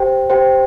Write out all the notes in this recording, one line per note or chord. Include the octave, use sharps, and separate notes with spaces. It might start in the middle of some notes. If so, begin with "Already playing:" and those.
Already playing: G4 C5 G5
G4 C5 G5